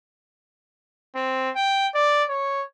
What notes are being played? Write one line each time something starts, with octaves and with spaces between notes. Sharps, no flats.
C4
G5
D5
C#5